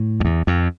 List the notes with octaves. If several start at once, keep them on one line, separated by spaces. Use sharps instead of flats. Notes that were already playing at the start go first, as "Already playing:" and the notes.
Already playing: A2
F2
E2
F2